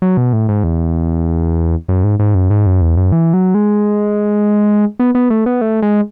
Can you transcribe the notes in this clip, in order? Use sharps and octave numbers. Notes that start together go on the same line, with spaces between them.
F#3
B2
A2
G#2
E2
F#2
G#2
G#2
F#2
G#2
F#2
E2
F#2
E3
F#3
G#3
B3
B3
A3
B3
A3
G#3